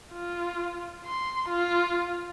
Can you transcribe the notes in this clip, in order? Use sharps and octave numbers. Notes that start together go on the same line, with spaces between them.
F4
C6
F4